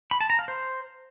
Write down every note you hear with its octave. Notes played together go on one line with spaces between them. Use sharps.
B5
A5
A#5
F5
C5